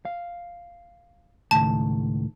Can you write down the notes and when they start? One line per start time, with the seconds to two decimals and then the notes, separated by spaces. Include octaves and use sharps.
0.05 F5
1.51 C#2 A2 D#3 A5